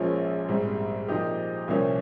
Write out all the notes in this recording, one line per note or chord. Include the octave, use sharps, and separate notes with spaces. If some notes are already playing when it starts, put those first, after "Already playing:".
Already playing: A#1 A#2 F3 G#3 C#4
A#1 G#2 G3 C4
A#2 F3 C4 D#4 G4
C2 A#2 F3 A#3 C#4